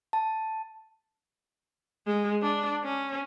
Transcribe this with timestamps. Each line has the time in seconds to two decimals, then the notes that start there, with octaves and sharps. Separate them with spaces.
0.13 A5
2.07 G#3
2.42 D4
2.84 C#4